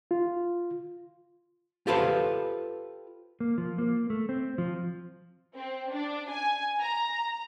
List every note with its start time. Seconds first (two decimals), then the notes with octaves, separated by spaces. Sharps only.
0.11 F4
1.87 F4 G4 A4 B4 C5 F5
3.40 A#3
3.58 F3
3.78 A#3
4.10 A3
4.29 C4
4.58 F3
5.55 C4
5.92 D4
6.31 G#5
6.81 A#5